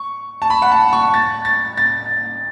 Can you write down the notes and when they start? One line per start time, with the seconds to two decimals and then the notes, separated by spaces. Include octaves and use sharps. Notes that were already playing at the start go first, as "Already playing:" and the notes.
Already playing: C#6
0.42 A5
0.50 B5
0.62 F#5
0.72 A5
0.93 C#6
1.14 A6
1.45 A6
1.77 A6